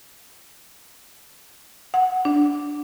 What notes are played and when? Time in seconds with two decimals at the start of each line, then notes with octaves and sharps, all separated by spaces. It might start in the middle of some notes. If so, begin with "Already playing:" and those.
1.94 F#5
2.25 D4